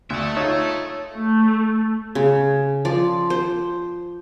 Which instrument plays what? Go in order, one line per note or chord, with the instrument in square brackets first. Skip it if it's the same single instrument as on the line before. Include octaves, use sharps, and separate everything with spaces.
[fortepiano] D2 [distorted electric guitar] A4 E5
[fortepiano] D#4 F4 [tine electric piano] C#5
[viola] A3
[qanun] C#3
F3 D5
C5